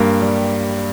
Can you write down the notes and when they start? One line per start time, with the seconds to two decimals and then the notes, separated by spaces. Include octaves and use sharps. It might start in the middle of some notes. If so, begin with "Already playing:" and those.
Already playing: G2 A#3
0.22 G3